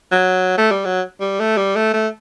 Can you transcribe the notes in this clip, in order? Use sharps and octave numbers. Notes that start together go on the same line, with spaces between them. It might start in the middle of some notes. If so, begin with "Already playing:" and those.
F#3
A3
G3
F#3
G3
A3
G3
A3
A3